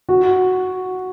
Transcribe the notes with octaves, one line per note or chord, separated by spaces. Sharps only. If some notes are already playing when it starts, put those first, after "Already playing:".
F#4